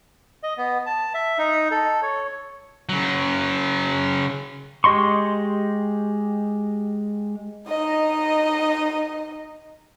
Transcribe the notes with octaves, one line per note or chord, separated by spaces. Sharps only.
D#5
B3
A5
E5
D#4
A4
C#5
C#3 F#3
G#3 G4 D#5 C6 C#6
D#4 D#5